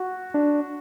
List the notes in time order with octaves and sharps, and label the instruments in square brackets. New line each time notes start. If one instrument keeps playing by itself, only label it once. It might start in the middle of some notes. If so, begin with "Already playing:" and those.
Already playing: [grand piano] F#4
[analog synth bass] D4